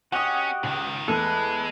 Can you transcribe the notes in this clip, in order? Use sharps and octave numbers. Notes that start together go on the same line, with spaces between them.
C#4 F#4 G4 D#5 F#5 D#6
C#2 G#2 D#3
E2 G#3 A3 A4 B4